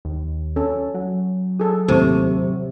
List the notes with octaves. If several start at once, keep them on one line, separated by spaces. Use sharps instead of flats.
D#2
C#4 A4
F#3
G#4 A4
D#2 A2 C3 A4 C#6